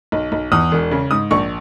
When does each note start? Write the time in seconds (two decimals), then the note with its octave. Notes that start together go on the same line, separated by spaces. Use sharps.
0.12 B1
0.32 B1
0.52 E2 D#6
0.71 E1
0.91 C#3
1.11 G#2 D#6
1.31 A#1 C#6